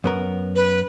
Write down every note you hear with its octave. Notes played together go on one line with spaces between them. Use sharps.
F#2 B3 A#4
B4